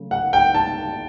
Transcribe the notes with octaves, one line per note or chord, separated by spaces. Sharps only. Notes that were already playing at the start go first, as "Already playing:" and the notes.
Already playing: C#3 F#3 A3
F#5
G5
A5